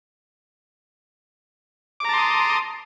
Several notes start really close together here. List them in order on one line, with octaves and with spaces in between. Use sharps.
D6 A#5 A5 C6 D#6